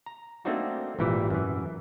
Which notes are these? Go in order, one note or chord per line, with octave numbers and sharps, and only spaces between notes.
A#5
A3 A#3 C4 D4 D#4 F#4
G#1 A#2 E3 G3 E4
F#2 E3